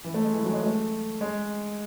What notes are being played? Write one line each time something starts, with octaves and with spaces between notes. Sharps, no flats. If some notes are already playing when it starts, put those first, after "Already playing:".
E3
A3
G#3
E3
F#3
G#3
A3
G#3